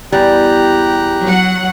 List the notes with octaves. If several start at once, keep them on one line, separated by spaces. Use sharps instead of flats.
E2 G3 G4 A#5 F#6
F#3 F#5